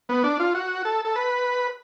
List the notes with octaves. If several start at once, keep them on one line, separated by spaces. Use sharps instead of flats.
B3
D4
F4
F#4
A4
A4
B4